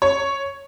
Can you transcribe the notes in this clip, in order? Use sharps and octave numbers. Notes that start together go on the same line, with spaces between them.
C#5